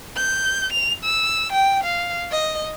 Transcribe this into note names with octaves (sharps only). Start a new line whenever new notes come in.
G6
F7
E6
G5
F5
D#5